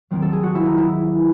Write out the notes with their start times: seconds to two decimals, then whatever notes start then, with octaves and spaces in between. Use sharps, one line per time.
0.11 D#2 D#3 F#3 C4
0.22 A4
0.33 G#4
0.43 F#4
0.55 E4
0.66 D#4
0.77 E4